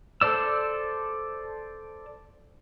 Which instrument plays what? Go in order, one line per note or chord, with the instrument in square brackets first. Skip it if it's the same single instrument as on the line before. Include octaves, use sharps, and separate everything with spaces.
[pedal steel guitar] A4 C5 D5 E6